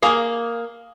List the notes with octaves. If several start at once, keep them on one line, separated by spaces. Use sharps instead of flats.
A#3 G#4 F5